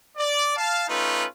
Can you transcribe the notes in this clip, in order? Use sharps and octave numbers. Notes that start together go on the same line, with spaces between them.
D5
F5 A5
A3 C#4 D#4 F4 B4